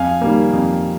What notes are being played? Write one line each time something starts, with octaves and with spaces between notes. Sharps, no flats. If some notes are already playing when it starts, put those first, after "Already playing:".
Already playing: F2 F5 G#5
D#3 G3 A#3
F2